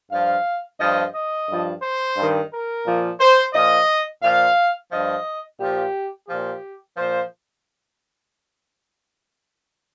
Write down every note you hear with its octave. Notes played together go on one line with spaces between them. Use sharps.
G2 F3 F5
G2 F3 D#5
D#5
G2 F3
C5
G2 D#3
A#4
A#2 F3
C5
A#2 F3 D#5
A#2 F3 F5
G2 F3 D#5
A#2 F3 G4
A#2 F3 G4
A#2 F3 C5